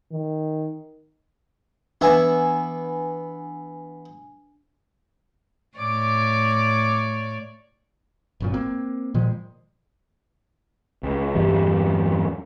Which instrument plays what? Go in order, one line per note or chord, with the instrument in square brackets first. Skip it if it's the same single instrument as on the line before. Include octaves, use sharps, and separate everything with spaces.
[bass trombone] D#3
[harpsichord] E3 B3 E4 [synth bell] D4 G#5
[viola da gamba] A2 C#5 D5 [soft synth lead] D6
[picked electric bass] G1 F#2 A#2
A#3 C4
A#2 D#3 F3 G#3
C#2
E2 G2 G3